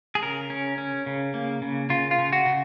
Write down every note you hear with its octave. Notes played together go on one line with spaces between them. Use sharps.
G#4
C#3 A#4
C#4
C#4
C#3
A#3
C#3
C#3 F4
F4
C#3
F#4
C#3